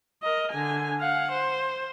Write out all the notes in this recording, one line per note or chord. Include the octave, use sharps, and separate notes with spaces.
A#4 D#5
D3 G#5
F5 F#5
C5